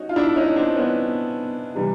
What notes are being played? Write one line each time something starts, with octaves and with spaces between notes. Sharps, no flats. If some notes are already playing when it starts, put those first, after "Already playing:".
Already playing: C#4 D#4 F#4
F4
D4 E4
C#4 D#4
C4 D4
B3 C#4
C3 E3 G3